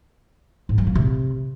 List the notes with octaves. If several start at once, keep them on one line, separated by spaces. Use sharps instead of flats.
G#2
F#3
A#3
C3